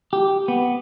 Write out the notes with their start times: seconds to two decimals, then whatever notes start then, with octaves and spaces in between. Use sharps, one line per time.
0.13 G4
0.48 B3